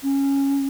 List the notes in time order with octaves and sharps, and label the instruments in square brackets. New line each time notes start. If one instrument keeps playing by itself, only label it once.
[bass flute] C#4